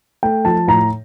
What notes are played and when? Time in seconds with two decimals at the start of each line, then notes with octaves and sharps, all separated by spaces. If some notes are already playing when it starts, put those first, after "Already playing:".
0.23 A3 G5
0.45 F3 A5
0.68 A2 A#5